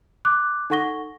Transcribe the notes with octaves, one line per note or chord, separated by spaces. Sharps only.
D6 F#6
D#4 A4 F#5 C#6 A#6 G7